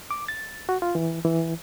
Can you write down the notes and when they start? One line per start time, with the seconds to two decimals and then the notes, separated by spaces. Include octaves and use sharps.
0.11 D6
0.28 A6
0.69 F#4
0.82 F4
0.95 E3
1.25 E3